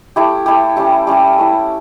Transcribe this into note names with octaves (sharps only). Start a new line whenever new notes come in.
A3 E4 G4
A3 E4 G4
G3 C#4 E4 G4
G3 C#4 E4 G4
A3 C#4 E4